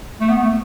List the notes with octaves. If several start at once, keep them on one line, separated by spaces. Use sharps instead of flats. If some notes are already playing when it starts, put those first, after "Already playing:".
A3
B3
A3